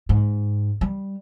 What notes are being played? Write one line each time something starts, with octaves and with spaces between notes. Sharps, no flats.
G#2
G3